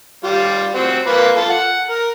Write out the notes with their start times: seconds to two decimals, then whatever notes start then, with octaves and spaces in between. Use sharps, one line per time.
0.24 G3 F4
0.75 C4 F#4
1.07 A#3 F4 B4
1.36 F4 A4
1.50 F#5
1.90 A#4